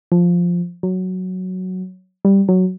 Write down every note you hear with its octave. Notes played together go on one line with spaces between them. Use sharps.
F3
F#3
G3
F#3